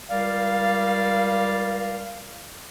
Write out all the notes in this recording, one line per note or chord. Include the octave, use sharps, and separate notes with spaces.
C#2 G3 A#4 D5 F5